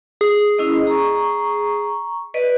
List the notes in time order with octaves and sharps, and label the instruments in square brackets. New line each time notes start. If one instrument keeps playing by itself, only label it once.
[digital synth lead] G#4
[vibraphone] C#4 E4 D#5
A#5 C#6
B4 D5 D#5